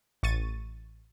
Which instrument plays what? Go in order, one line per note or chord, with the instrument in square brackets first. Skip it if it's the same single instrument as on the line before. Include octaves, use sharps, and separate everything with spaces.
[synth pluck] A1 C#6 A6 D#7